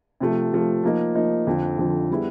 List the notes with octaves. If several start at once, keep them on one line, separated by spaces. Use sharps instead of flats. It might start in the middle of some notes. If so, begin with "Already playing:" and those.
C3 F3 A3
C3 F3 A3
F3 A#3 D#4
F3 A#3 D#4
F2 D3 F3
F2 D3 F3
G3 B3 E4 G#4